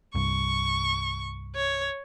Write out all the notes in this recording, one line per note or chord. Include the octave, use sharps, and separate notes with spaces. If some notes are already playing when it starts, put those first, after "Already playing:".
C2 G2 C#6
C#5